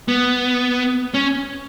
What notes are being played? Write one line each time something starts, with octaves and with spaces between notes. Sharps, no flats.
B3
C#4